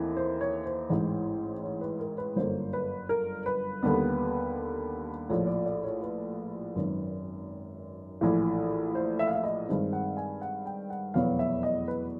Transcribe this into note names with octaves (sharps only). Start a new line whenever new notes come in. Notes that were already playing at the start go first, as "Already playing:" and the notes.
Already playing: D#2 E3 A3 C4
C5
C#5
C5
A1 G#2 E3
C#5
B4
A#4
B4
G1 F#2 D3 F#3 A#3 C5
B4
A#4
B4
D#2 D3 G3 B3
A#1 A2 F3 C#5
D5
D5
C#5
B4
G#1 F#2 D#3
A#1 A2 E3
C5
E5
F5
E5
D#5
G2 D#3 G#3 C4
F#5
G#5
F#5
G5
F#5
F1 E2 B2 F#3 B3 F5
E5
D#5
B4